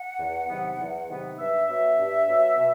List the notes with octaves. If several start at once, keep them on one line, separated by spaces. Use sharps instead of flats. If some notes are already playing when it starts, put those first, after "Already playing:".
Already playing: F#5
E2
C3 D#3 F#3 B3
E2
C3 D#3 F#3 B3
G2 E5
F#3 B3 E5
G2
F#3 B3
B2